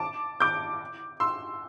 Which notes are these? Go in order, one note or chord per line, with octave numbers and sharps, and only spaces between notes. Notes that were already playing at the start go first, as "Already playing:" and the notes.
Already playing: A5 D6
D6 G6
C6 E6